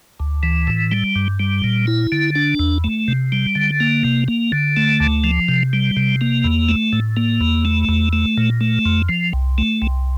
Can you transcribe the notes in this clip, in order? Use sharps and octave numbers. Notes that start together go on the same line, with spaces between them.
D2
E3
A2
G3
G2
G3
A#2
E4
D3
D4
E2
A3
C3
G3
D3
A#3
C3
A#3
D3
A3
D2
F3
C3
G3
C3
A#3
E2
A3
A2
A#3
E2
A3
E2
A3
A#2
A3
F2
F3
C2
A3
C2